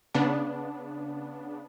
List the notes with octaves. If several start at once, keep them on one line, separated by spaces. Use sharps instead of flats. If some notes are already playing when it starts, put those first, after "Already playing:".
C#3 B3 D4